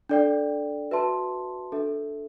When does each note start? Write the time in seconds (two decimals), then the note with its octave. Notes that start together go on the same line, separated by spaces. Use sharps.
0.09 D4 A4 D5 G5
0.91 F#4 B4 E5 A5 C6
1.72 D4 A4 E5